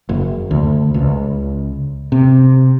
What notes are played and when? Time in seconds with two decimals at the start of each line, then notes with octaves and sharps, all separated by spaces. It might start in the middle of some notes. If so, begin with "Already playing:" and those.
0.09 F#1
0.51 D2
0.94 C#2
2.12 C3